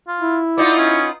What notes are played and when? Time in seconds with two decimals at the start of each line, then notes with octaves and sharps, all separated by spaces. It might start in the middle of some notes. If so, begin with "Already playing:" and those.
0.08 F4
0.21 E4
0.58 B3 D#4 F4 D5
0.78 C#4